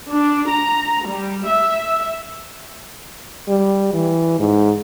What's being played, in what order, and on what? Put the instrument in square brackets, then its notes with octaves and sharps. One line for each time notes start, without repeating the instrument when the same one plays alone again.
[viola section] D4
A#5
G3
E5
[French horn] G3
E3
G#2